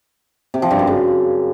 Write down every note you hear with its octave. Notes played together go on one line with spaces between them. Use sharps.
C3
F3
G2
F#2
C#3